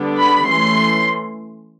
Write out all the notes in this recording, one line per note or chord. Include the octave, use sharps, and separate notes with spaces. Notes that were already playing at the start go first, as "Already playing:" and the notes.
Already playing: D3 G3 B3 D4
B5
E3 A3 C#4 C6